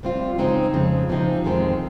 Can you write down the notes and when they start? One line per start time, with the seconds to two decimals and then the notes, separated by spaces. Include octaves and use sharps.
0.03 C3 G3 C4 F4
0.38 C#3 G#3 C4 D#4
0.74 F2 C#3 F3 G#3
1.09 C3 F3 C4 D#4
1.44 F2 D#3 G#3 C4